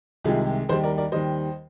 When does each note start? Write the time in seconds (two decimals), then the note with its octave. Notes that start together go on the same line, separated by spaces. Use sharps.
0.24 C2 C3 D#3 G#3 F4 G#4
0.69 D#2 D#3 G3 G#4 C5
0.84 A#4 D5
0.98 A#4 D5
1.12 D#2 D#3 G3 C5 D#5